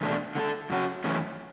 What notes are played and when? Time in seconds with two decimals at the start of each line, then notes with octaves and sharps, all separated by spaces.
0.01 E2 B2 A3 D4
0.35 D3 A3 D4 A4
0.70 F#2 C#3 F#3 C#4 F#4
1.04 F#2 E3 A3 C#4